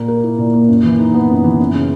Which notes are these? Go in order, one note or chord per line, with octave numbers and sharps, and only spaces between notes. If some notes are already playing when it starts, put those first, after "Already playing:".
Already playing: A#2 A#3
A#4
E4
A#2
A#3
F#2
E3
D#4
B3
F#2
E3
F#2
C#3